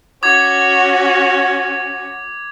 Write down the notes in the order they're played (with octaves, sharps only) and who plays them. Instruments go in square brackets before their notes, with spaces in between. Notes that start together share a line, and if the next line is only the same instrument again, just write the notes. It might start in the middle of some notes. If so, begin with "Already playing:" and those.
[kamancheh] C#4 F#4 [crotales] D6 G#6